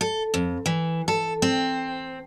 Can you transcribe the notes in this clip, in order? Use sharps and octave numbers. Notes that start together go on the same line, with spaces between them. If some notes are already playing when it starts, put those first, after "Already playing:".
A4
F2
E3
A4
C4